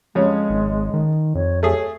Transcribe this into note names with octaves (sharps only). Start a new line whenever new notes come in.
F2 G#3 C#4
G#1
D#3
F2 C#5
A3 G#4 C#5